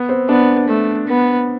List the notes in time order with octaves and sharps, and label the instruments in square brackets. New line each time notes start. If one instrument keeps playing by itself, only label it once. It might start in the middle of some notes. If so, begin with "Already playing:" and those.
Already playing: [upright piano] B3
C4
[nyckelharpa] B3 [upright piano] D4
[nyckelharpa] A3
B3